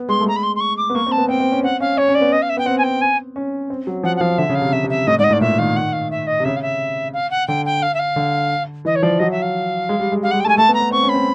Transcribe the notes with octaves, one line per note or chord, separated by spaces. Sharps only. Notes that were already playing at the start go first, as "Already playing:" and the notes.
Already playing: B3
G#3 C6
A3
G#3 A#5
B5
C6
C6
C#6
D6
B3
A#3 C#6
C4
A5
B3
C4 G5
C4
C#4
C4 F#5
C#4 F5
C#4 C#5
C#4
D5
B3
D#5
F5
E5
B3 G5
C4 F#5
G#5
G5
G#5
C#4
C4
F#3
F3 F#5
F#5
F3 F5
D3 E5
C#3
F5
C3
C#3 E5
C3
E5
A2 D#5
G#2 D5
D#5
A2 D5
A#2 E5
D#3 F5
F#5
F5
E5
D#5
C3
C#3 E5
F5
E5
F5
F#5
D3 G5
G5
F5
E5
F5
D3
E3 D#5
C#5
F3 D5
F#3 D#5
E5
F5
G#3
G3
G#3
G3 F5
G#3 F#5
G5
A3 A5
G#5
A3 A5
B3
A#5
B3
C4 C#6
C#4
B5
C4